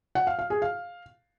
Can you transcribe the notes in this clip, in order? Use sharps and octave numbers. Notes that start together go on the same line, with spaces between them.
F#5
F5
F5
G#4
F5